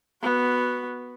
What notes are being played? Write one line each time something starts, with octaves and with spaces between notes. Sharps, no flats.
B3 F#4